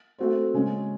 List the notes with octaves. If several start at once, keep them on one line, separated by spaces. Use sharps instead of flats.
A3 C4 F#4 C5
C#3 G#3 C#4